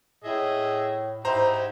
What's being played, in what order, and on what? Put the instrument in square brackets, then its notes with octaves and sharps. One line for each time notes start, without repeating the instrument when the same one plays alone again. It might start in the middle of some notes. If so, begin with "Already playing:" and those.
[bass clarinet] A2 [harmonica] G#4 D#5 E5
[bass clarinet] G#2 [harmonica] D#4 E4 G4 [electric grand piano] C5 A#5